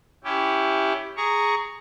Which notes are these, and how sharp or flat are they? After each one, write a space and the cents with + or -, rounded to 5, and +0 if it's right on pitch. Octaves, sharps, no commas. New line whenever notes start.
C#4 +15 E4 +0 G4 +0
G#4 +0 A#5 -10 C#6 +10